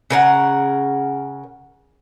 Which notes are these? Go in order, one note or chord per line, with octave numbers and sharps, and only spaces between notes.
C#3 A#4 F#5